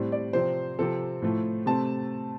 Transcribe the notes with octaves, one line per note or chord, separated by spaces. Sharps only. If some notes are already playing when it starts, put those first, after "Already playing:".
Already playing: A2 G3 C4
D5
C3 F3 C4 C5
C3 F3 C4 A4
A2 F3 A3
C3 A3 C4 A5